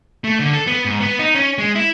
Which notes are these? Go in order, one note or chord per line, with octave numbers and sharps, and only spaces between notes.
A3
D3
A4
B3
G#2
B3
D#4
C#4
G#3
E4